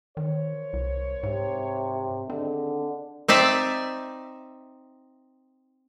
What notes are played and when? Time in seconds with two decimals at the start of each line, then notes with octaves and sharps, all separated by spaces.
0.17 D#3 A#4 C5 C#5
0.73 C2
1.23 G#2 C3
2.30 D3 D#3 C4 G#4 D#5
3.28 C4 D#4 D5 E5